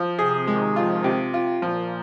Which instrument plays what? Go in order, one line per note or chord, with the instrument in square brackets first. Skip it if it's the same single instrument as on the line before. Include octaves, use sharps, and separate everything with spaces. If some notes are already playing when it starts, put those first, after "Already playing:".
Already playing: [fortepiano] F3
[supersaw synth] C3 [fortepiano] G#4
[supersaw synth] D#3 [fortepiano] G#3
[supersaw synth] F3 [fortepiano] F4
[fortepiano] C3 [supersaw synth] F3
[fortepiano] F4
[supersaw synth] A#2 [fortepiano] F3